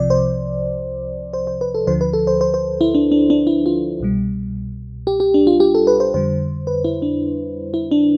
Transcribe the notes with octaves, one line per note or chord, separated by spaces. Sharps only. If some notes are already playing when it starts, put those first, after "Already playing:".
Already playing: C2 C3 F3 D5
C5
C5
C5
B4
A4
D2 D3 F3 C5
B4
A4
C5
C5
C5
E4
D4
D4
D4
E4
F4
C2 B2 G3
G4
G4
D4
F4
G4
A4
B4
C5
F2 D3 G3 C5
B4
E4
D4
E4
D4